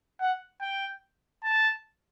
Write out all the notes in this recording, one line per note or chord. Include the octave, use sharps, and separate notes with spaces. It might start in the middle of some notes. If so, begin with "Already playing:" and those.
F#5
G5
A5